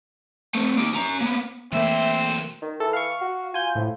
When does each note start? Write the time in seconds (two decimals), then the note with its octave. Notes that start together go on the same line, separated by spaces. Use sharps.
0.55 A3 C4
0.77 A#3 D#4
0.93 C#4 A#5
1.21 A#3 B3
1.73 B1 E3 A3 A#3 C4 C5 E5
2.62 D#3
2.80 E3 A4
2.93 F5 C#6
3.21 F#4
3.54 F4 G#5 G6
3.75 A2 F3